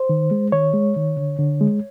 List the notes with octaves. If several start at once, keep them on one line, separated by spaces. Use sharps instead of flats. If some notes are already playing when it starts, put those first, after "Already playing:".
Already playing: C5
D#3
G#3
D#3 C#5
G#3
D#3
D3
D3
G#3